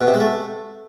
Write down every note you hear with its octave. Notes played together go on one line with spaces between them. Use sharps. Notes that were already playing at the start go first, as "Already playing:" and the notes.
B2
C3
G#3
A3